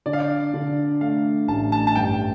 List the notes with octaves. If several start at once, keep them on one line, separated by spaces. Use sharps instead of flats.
D3 D5
F5
D5
D3
A3 F5
A1 A5
A5
A5
G2 G5